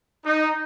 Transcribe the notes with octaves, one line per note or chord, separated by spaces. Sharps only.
D#4